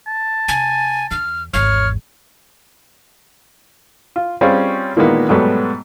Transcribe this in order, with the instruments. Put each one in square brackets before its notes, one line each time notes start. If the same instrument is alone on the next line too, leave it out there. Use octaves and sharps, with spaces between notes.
[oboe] A5
[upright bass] C3 [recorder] G#5
[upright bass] E2 [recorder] F6
[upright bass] G#1 E2 [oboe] C#5 [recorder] F6
[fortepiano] F4
G3 C4 C#4 F4 G#4 C#5
A#2 D#3 E3 G#3 A#3 B3
G#2 B2 F#3 G3 A3 B3